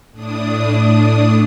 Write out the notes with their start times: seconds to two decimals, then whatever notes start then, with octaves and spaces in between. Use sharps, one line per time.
0.12 A2 D4 D#6